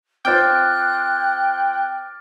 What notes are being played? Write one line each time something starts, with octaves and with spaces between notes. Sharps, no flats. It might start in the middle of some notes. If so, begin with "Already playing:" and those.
C4 F4 C5 G5 D6 F6 F#6 A6